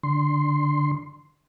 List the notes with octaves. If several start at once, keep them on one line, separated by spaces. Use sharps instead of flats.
D3 C6